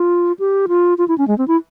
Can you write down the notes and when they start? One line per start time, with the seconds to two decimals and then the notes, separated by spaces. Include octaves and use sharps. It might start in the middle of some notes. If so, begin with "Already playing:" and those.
Already playing: F4
0.39 G4
0.68 F4
0.98 F4
1.08 E4
1.18 C#4
1.28 G#3
1.38 C4
1.48 E4